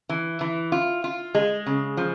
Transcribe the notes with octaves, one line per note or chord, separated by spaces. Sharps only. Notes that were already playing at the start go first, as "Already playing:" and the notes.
E3
E3
F4
F4
G#3
C#3
F3